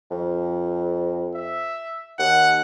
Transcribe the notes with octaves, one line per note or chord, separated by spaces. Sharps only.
F2
E5
D#2 F#5